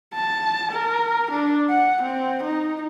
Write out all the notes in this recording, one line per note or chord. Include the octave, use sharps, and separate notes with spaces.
A5
A#4
D4
F#5
C4
D#4